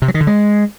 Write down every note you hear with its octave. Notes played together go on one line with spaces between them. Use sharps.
C3
F#3
D#3
D3
G#3